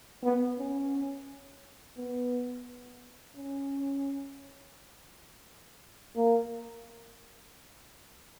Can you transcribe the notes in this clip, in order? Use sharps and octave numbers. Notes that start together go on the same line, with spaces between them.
B3
C#4
B3
C#4
A#3